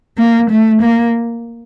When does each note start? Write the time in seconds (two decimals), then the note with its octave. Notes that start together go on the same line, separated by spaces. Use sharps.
0.18 A#3
0.50 A3
0.81 A#3